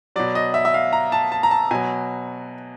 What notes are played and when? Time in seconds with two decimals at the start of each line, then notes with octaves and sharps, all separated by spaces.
0.16 B2 F#3 D5
0.35 D#5
0.54 E5
0.65 E5
0.74 F5
0.93 A#5
1.12 A5
1.32 A5
1.43 A#5
1.51 A5
1.71 B2 F#3 G#5